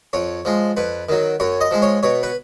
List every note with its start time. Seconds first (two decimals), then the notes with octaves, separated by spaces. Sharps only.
0.13 F2 C#5
0.45 F3 G#3
0.77 F2 B4
1.09 D#3 F#3
1.40 F#2 C#5
1.61 D#5
1.71 F3 G#3
1.82 C#5
2.03 B2 C#5
2.23 B4